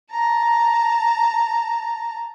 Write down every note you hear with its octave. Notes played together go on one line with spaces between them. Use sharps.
A5 A#5